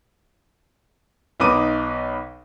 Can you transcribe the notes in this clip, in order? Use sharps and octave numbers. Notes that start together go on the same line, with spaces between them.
B1 D#4 B4 D6 D#7